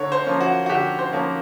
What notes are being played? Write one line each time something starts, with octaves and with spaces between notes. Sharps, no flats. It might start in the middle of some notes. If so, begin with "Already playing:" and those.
Already playing: D3 A#3 C#5
C5
F3 A#3 C#4
F#4
F#4
D3 G4
C5
F3 A#3 C#4